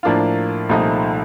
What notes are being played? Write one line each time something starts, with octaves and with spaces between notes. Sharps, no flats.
A2 F3 A#3 D4 F4
C2 A#2 F3 A3 D#4